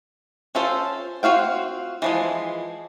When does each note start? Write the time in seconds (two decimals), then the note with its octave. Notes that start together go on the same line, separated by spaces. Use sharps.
0.55 C#4 F4 A4 C5
1.23 C4 F4 F#4 F5 G5
2.02 E3 F3 G#3